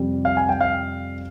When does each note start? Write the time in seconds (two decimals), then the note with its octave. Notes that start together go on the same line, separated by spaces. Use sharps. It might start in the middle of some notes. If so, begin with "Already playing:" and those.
Already playing: F2 C3 G3 C4
0.25 F5
0.37 G#5
0.49 G5
0.61 F5